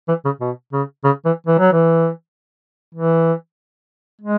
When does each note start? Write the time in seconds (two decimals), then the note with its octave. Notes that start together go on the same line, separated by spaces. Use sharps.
0.08 E3
0.25 C#3
0.41 B2
0.73 C#3
1.04 C#3
1.25 E3
1.47 E3
1.59 F#3
1.72 E3
2.95 E3
4.21 G#3